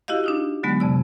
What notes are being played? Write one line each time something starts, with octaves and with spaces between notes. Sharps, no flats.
E4 F#4 G4 D#5 F5
D4 D#4 F4
D3 F#3 G#3 B3
F2 C3 D5 E6